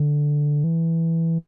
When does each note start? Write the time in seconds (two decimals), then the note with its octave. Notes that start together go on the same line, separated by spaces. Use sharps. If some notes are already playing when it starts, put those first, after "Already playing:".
Already playing: D3
0.64 E3